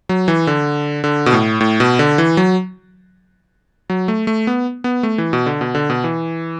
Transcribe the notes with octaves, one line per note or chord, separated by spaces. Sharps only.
F#3
E3
D3
D3
B2
A2
A2
B2
D3
E3
F#3
F#3
A3
A3
B3
B3
A3
E3
B2
D3
B2
D3
B2
E3